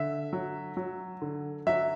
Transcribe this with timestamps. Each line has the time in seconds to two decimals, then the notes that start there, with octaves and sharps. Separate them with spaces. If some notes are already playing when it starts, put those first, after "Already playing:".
Already playing: D3 E5
0.33 F#3
0.77 F#3
1.22 D3
1.67 F#3 E5